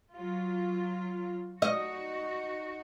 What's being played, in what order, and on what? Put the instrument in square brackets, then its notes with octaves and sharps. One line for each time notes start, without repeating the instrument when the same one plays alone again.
[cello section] F#3 F4
[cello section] D#4 F#4 [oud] D#5